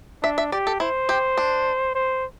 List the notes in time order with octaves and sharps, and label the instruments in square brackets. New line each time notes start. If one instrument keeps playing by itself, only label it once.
[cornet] D4 [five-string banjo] E5
[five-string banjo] E5
[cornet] G4 [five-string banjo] D5
[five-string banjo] A4
[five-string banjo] E4 [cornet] C5
[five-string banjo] G4
D4
[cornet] C5